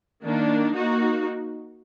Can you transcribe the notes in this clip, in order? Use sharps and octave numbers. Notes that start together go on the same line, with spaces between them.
D#3 A#3 D4
A#3 D#4 F#4